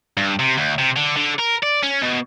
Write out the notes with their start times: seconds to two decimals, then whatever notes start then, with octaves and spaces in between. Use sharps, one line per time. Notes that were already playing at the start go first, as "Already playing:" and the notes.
0.17 G2
0.39 C3
0.57 D2
0.78 C3
0.96 D3
1.17 D3
1.39 A#4
1.63 D5
1.83 C#4
2.02 B2